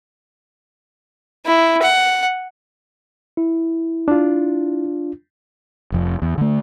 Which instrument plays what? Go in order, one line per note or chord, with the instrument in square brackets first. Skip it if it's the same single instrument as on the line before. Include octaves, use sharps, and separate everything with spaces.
[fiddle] E4
F#5
[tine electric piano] E4
[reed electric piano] D4 F4
[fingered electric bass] F1 F2
E2
D3 A3